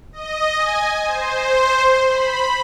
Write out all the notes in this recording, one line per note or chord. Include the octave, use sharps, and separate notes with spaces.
D#5
G#5
C5
B5